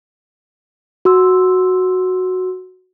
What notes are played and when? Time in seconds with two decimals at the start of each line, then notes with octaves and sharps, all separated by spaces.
1.05 F#4 C6 E6